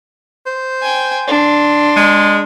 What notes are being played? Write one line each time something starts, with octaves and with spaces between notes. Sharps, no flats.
C5
G5 G#5
D4 C6
G#3